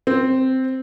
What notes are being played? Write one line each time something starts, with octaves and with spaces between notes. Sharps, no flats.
C4